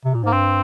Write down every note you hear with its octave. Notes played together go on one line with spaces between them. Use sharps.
C3
A#2
G#2 A#3
G2 C4